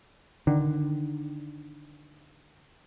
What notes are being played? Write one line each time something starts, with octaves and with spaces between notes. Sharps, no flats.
D3 D#3